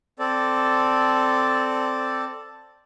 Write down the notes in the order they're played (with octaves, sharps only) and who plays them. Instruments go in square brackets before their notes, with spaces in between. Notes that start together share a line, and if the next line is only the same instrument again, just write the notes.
[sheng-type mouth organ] C4 A4 D5